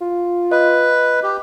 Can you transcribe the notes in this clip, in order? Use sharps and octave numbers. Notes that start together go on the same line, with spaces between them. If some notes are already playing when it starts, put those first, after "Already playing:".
F4
B4 D#5
G4